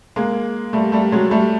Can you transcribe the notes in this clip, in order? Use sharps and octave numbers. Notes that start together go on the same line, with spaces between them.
G#3 A#3
G3 A3
G3 A3
F#3 G#3
G3 A3